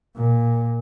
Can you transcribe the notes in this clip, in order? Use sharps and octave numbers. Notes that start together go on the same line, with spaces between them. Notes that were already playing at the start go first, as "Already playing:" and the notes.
A#2